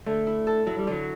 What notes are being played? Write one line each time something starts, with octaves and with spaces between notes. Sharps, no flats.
D3 A3
E4
A4
F#3 E4
G3
D3 F#3